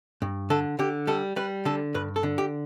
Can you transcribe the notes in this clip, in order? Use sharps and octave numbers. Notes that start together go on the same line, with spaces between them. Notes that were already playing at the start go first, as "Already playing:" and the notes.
G2
D3 A4
D3 G4
G3 A4
G3 B4
D3 A4
G2 B4
A4
D3
G4